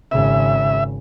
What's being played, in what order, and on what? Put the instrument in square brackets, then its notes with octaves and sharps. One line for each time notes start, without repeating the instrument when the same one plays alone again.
[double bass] G#1 C#3 [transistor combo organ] E5